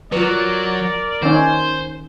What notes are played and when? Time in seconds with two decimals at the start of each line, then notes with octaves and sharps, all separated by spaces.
0.12 F#3 F4 A#4 B4 D5
1.23 D#3 C#4 C5